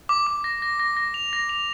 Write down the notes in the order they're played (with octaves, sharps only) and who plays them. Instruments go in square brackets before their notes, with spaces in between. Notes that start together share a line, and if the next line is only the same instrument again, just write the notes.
[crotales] D6
D6
A#6
A#6
A#6
A#6
F7
A#6
F7